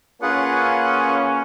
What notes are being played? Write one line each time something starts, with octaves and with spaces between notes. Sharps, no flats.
A#3 C#4 F4 G#4 B4 F#5